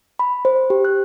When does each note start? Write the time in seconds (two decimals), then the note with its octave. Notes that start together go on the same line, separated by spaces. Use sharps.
0.19 B5
0.45 C5
0.70 G4
0.85 F#6